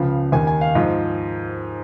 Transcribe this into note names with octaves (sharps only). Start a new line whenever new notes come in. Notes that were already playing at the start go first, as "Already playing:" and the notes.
Already playing: C#2 C#3 F3 F5
D#2 D#3 G#5
G#5
F5
G#2 F3 D#5